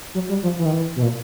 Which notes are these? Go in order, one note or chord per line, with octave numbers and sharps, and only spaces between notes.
F#3
G3
F3
E3
D#3
E3
B2
A#2